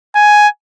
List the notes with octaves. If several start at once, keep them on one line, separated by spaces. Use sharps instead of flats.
G#5